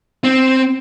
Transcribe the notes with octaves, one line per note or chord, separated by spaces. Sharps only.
C4